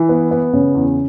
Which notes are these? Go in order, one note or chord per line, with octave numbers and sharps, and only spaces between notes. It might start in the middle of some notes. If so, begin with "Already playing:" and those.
Already playing: E3
B3
B3
C#3
E2